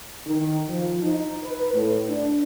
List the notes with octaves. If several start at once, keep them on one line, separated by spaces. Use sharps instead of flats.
D#3
F3
D#4
B4
A2
D4